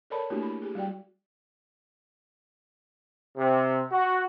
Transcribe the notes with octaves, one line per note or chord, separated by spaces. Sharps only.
A4 A#4 C#5 D5 A5 B5
A3 A#3 D4 E4 F#4 G4
B5
G4 G#4
G3 F#4 D5 G5
C3
F#4